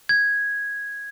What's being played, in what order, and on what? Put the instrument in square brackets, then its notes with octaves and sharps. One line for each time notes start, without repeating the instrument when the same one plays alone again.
[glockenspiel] G#6